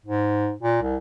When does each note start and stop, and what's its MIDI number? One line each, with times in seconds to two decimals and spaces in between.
0.05 0.53 44
0.62 0.80 46
0.82 0.97 36